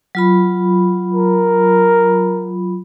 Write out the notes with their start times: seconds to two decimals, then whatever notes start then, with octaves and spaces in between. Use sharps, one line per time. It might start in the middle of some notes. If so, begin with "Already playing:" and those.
0.15 F#3 F4 B5
1.14 A#4